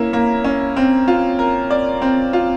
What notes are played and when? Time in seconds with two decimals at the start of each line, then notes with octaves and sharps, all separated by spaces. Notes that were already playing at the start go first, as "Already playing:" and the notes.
Already playing: A#3 C#4 E4
0.13 A#3
0.44 C#4
0.77 C4
1.08 F4
1.39 A#4
1.71 D5
2.02 C4
2.33 F4